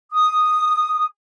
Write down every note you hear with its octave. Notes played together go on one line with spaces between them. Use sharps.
D#6